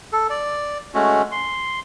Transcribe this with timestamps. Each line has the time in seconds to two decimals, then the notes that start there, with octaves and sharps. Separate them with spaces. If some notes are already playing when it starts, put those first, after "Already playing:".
0.13 A4
0.30 D5
0.94 G#3 A3 C#4 F#4
1.32 C6